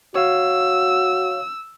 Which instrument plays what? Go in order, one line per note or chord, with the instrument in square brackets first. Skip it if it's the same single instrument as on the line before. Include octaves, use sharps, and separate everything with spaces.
[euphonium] F#4 [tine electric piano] C#5 F5 [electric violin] E6